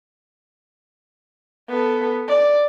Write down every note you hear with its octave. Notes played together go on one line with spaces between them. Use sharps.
B3 A4
D5